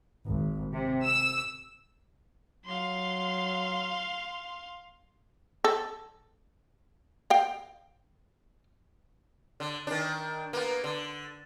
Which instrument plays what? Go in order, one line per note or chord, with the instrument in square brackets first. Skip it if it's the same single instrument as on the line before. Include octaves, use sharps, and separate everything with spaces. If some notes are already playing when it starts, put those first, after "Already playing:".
[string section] G#1
C3
E6
[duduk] F#3 [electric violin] F5 C6
[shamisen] A4
F5 G5
[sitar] D3
D#3 D4
A#3 B3
D3